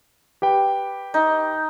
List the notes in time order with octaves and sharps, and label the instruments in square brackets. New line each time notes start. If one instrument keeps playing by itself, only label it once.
[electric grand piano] G4 B4 G5
[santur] D#4